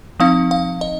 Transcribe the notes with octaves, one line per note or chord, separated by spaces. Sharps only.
F3 C4 D#4 F5
F5
D#5